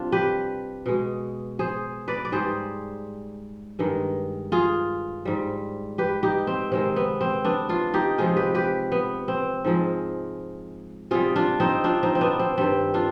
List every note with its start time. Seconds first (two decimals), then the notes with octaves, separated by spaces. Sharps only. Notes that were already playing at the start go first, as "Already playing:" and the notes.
Already playing: C3 G3 D4 F4
0.12 G4 B4
0.86 B2 G#3
1.59 G#4 C5
2.08 B4 D5
2.25 D5
2.32 G#2 G3 G#4 C5
3.79 G2 D#3 G#3
4.52 F4 G#4
5.25 G#2 G3
5.98 G4 B4
6.23 D#4 G4
6.47 C4
6.71 C3 D#3 G#3 C4
6.96 B3
7.21 C4
7.45 B3 D4
7.69 D4 F4
7.94 D#4 G4
8.18 C3 F3 G#3 F4 G#4
8.37 G4 B4
8.55 G4 B4
8.92 B3
9.28 C4
9.64 G#2 F3 G#3
11.11 C3 G3 F4 G#4
11.36 D4 F4
11.60 C4 D#4
11.84 D4 F4
12.03 C4 D#4
12.15 C4
12.21 B3 D4
12.40 C4
12.57 G2 D#3 G3 C4
12.94 D4 F4